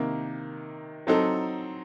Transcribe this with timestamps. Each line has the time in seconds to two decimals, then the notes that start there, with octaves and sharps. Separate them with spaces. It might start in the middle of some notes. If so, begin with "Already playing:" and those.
Already playing: C3 D#3 A#3
1.07 F#3 C4 D#4 A4